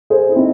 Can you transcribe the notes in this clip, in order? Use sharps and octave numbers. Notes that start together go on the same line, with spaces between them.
G#4 C5
E4
C4 D#4